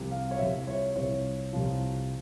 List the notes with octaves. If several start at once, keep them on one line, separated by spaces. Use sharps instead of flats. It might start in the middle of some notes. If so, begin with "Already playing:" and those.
Already playing: C2 C3 F3
F5
C#5
C2 C3 F3 E5
C#5
C2 C3 F3 C#5
C2 C3 F3